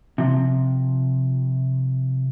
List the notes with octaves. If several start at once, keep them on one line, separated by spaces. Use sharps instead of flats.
C3 F3